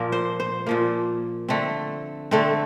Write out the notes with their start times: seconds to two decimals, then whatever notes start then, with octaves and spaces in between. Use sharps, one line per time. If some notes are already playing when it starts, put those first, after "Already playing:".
Already playing: A#2 F3 A#3 A#4
0.12 C5
0.40 C5
0.66 A#2 F3 A#3
1.49 D3 A3 C4
2.31 D3 A3 C4